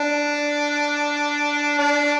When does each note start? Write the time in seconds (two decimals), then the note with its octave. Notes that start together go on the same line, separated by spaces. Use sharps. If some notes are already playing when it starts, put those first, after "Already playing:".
Already playing: D4
1.79 D4